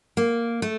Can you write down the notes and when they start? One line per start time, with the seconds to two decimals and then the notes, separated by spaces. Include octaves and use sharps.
0.17 A#3
0.62 A3